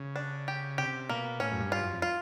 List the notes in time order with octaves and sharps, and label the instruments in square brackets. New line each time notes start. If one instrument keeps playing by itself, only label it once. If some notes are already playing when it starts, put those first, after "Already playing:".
Already playing: [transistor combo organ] C#3
[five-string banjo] D4
G4
[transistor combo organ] C3 [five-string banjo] G4
[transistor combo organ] B2 [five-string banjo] A#3
[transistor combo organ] A2 [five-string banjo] C#4
[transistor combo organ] F#2
G2
[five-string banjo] F4
[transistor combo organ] F#2
F2
[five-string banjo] F4